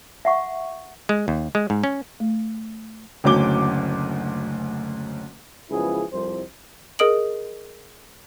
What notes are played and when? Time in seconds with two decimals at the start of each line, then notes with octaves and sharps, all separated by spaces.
0.25 E5 F#5 C#6
1.09 G#3
1.28 D#2
1.55 G#3
1.70 G#2
1.84 C#4
2.20 A3
3.24 F#1 D2 F#3 C#4 D6 G7
5.70 C#2 F#2 F3 B3 E4 G#4
6.12 C2 F2 C5
6.99 G#4 A#4 D#5 D#6 D7 F#7